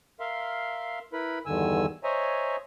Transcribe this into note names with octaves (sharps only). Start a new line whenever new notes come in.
A#4 E5 F5 C6
E4 A#4 B4 B5
E2 G2 D3 D#3 G#5 E6
C5 C#5 D#5 E5 G#5 A#5